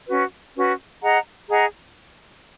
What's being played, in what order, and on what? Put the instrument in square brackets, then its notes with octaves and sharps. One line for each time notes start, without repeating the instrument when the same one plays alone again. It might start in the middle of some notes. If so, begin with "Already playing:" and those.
[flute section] C#4 F#4 B4
C#4 F#4 B4
G#4 D#5 F#5 A#5
G#4 D#5 F#5 A#5